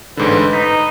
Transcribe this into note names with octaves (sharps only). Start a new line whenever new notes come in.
A1 G#2 D3 B4
D#4 B6